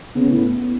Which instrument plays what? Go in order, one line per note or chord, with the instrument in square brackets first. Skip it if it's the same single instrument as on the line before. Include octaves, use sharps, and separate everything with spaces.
[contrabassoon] C#3 [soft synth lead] B3
[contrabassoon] A2